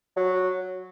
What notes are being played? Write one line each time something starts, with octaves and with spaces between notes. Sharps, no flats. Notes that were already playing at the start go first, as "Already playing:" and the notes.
F#3